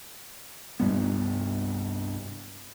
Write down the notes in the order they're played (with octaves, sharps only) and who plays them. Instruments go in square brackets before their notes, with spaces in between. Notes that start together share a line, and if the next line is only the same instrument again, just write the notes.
[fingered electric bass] C2 G2 G3 B3